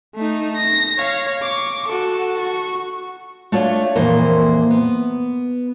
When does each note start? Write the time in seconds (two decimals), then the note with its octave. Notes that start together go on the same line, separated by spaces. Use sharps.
0.15 A3 D#4
0.56 A#6
0.98 C#5 F5
1.42 C#6 D6
1.88 F#4 A4
2.40 F#4 C#6
3.52 A3 D4 F4 C#5 F#5
3.95 F2 A#2 E3 A#3 C5
4.70 B3